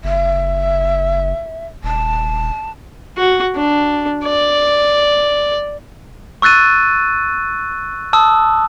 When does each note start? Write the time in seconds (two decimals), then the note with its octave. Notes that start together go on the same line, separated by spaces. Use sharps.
0.04 F#1 E5
1.83 D#1 A5
3.17 F#4
3.56 D4
4.25 D5
6.42 C#6 E6 F#6 A6 D#7
8.13 A5 D#6 E6